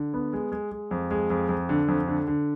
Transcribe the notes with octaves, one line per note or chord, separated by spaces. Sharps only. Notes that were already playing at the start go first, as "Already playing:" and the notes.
Already playing: D3
B3
G#3
G#3
G#3
F2
G#3
F2
F2
D3
F2
D3
D3